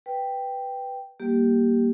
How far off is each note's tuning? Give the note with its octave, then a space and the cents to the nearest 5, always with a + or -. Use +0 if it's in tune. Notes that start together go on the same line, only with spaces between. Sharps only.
B4 +0 G5 +0
G3 -10 A#3 +0 G4 +0